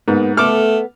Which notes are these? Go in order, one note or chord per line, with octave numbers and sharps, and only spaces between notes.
G#2 A#3 B3
A3 B3 A4 D6 F6